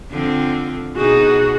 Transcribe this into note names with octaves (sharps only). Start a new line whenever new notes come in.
D3 F3 C4
B2 D#4 F#4 G#4